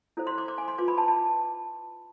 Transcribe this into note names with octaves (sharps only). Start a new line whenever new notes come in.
E4 A4 C5
C6
D6
D6
G#5
C6
F4 B4 D6
B5
A5
A5